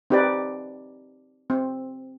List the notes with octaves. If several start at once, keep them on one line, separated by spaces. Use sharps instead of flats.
C4 D#4 G4 B4 D5
C4